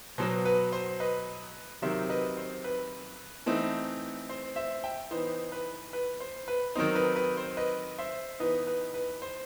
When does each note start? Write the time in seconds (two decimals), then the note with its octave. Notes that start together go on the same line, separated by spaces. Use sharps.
0.18 B2 F#3 B3 C5
0.45 B4
0.72 C5
1.00 B4 D#5
1.82 C3 D#3 F#3 C4 C5 E5
2.09 B4 D#5
2.37 C5
2.64 B4
3.46 E3 A3 C4 D#4
4.29 C5
4.56 C5 E5
4.84 E5 G5
5.11 E3 B3 D#4 C5
5.52 B4
5.93 B4
6.20 C5
6.48 B4
6.75 D#3 F#3 C4 D#4 C5
6.95 B4
7.16 B4
7.37 C5
7.57 B4 D#5
7.98 C5 E5
8.40 E3 B3 D#4 B4 D#5
8.67 B4
8.94 B4
9.22 C5